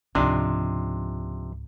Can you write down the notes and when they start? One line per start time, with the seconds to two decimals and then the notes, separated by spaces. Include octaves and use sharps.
0.15 C#2 G#2 C3 F3 D4 D#4